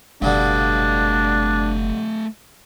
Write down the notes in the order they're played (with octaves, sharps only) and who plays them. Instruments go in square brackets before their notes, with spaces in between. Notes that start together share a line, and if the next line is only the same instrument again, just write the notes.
[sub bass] F#1 [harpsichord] G2 B2 D3 [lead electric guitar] A3 F5 [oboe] D4